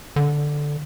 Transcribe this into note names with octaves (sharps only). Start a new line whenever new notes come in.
D3